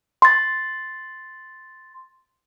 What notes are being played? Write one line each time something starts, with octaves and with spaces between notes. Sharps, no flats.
C6 A6